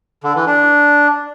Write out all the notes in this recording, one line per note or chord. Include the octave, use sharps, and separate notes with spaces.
D3
E3
D4